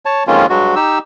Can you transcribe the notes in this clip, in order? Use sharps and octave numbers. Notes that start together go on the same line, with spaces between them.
C#5 A5
F2 D#3 G#3 A#3 C#4 F4
G2 F#3 G#3 F#4
D#4 G4 E6